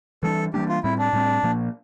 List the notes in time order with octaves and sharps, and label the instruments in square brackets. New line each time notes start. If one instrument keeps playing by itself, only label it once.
[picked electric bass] E3 G3 A#3 D4 [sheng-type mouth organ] A4
[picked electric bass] E3 G3 A#3 D4 [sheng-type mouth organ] G4
[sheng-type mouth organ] F4
[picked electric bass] A2 G3 C4 [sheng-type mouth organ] E4
[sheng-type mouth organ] D4
[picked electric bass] A2 G3 C4
A#2 F3 A#3